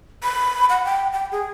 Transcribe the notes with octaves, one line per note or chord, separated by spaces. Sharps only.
B5
F#5
G5
G5
G#4